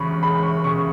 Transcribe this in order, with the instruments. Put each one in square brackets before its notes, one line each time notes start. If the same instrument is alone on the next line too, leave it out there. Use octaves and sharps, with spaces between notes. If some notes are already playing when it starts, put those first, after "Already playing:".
Already playing: [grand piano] E2 C#3 B5 C#6
G#3 B5
C#6
C#3 C#6